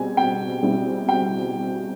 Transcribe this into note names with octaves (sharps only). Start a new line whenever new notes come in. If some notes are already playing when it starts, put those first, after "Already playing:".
Already playing: B2 G3 C4 G#4 G#5
G5
B2 G3 C4 E4 G#4
G5